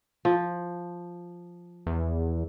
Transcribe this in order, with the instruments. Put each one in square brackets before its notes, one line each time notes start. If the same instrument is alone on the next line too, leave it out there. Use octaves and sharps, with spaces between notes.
[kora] F3
[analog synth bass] E2